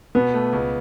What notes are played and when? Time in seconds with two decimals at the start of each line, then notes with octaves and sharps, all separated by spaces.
0.15 B2 B3
0.34 A3
0.53 C#2